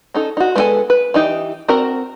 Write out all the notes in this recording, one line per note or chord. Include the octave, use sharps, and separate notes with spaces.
C#4 D#4 A4
D#4 F#4
G#3 B3 F4 A4 G#5
B4
E3 D#4 G4
C4 F#4 A#4 A#5